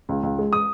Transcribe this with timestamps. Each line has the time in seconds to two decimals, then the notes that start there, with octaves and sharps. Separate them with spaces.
0.09 C#2
0.23 C#2
0.39 G#3
0.53 D#6